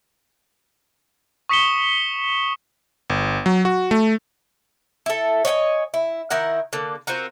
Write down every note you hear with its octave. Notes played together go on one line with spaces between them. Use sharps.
C#6 D#6 B6 C#7 E7 G7
G1
F#3
F#4
A3
E4 A4
C#5 D#5 F#5 G#5
E4
D#3 E4 A#4 F#5
D3 A#3
C4 F4 F#4 A#4